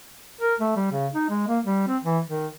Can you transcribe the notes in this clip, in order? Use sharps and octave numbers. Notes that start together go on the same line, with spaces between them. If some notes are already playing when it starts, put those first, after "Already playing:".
A#4
A3
G3
C#3
D#4
G#3
A#3
G3
C4
E3
D#3